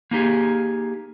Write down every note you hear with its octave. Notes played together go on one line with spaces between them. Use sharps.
A#3 D#4 G4 G#4